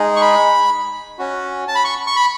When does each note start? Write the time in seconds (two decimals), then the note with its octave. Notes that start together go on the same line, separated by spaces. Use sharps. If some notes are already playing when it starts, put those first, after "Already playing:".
Already playing: G#3 D#4 G#4
0.16 C#6
0.21 B5
1.19 C#4 F#4
1.68 A5
1.75 B5
1.85 C#6
2.07 C#6
2.16 B5